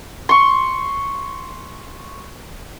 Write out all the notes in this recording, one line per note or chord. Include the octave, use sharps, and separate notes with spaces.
C6 C#6